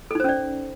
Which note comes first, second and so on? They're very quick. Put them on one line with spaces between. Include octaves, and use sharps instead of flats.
A4 D#4 C5 C#4 D5